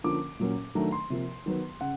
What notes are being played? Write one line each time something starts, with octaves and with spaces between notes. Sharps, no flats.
D3 F3 A#3 C#4 D6
A#2 F#3 A#3 C#4
D#3 F#3 A3 D4 A#5
C6
C3 F3 A#3
D#3 F#3 B3
C#3 F#5